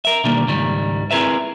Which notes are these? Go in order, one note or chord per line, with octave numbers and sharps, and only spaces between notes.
A#4 E5
B2 D3 D#3 G3 A#3
C#2 G#2 D#3 G3
C4 E4 G#4 A#4 B4 E5